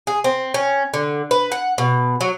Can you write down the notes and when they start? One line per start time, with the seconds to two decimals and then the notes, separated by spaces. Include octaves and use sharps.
0.07 G#4
0.24 C4
0.54 C#4
0.94 D3
1.31 B4
1.52 F#5
1.78 B2
2.21 F#3